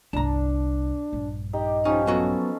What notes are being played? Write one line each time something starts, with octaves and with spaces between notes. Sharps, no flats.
G1 C2 D4 A5 A#5
A#1 G2
D#4 G4
F3 C#4 D#4 G4
F#3 B3 C#4 F#4 A4